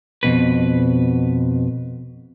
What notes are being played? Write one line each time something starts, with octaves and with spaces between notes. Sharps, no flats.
F2 B2 B4